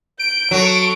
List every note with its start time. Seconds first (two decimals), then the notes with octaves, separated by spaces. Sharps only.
0.19 G6 D7
0.51 F#3 A4 C#6